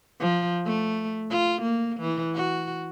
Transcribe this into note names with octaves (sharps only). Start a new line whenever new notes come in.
F3
A3
F4
A#3
E3
F#4